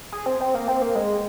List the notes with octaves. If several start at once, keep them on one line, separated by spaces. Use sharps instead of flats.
G#4
C4
C4
A#3
C4
A#3
G#3